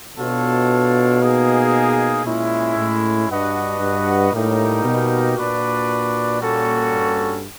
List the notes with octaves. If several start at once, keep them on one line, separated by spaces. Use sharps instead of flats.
B2 D4 F4 A4 C#5 F5
A#3 D#4 G#4
A#2 G#3 C#4 E4
A2
G2 D4 F#4 B4 D#5 F#5
G2
A2 G3 A#3 D#4 G4 A#4
B2
A#2 D4 F#4 B4 D5
G3 A#3 C#4 F#4 A4
G2